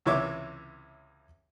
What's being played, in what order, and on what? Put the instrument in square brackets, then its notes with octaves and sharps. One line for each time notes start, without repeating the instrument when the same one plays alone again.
[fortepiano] C#2 C3 E3 C#5 E5 D6